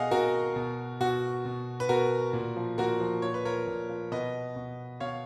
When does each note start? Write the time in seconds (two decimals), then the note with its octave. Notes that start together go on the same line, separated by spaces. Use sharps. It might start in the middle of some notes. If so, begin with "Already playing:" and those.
Already playing: B2 G#4 D#5 F5 F#5 G#5
0.11 B2 F#4 A#4
0.56 B2
1.00 B2 F#4
1.45 B2
1.80 B4
1.89 B2 F#4 A#4
2.33 A#2
2.56 F3
2.78 A#2 F#4 A#4
3.01 F3
3.22 A#2 C#5
3.34 B4
3.45 F3 A#4 C#5
3.67 A#2
3.89 F3
4.12 B2 B4 D#5
4.56 B2
5.00 B2 C#5 F5